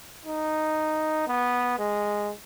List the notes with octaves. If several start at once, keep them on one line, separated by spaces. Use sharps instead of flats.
D#4
B3
G#3